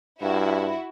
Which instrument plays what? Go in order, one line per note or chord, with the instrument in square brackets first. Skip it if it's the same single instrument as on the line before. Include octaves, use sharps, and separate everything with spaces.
[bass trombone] G2 [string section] E4 F#4